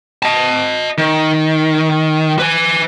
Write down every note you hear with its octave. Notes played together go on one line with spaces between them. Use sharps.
D#5 A5
D#3
B4 G#5